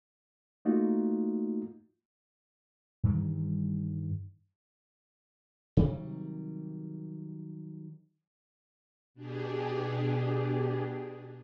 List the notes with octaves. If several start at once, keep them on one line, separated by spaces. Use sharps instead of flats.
A3 A#3 D#4 F4 F#4
G2 D#3 E3 G3
C3 D#3 F#3 G3
B2 D4 G4 G#4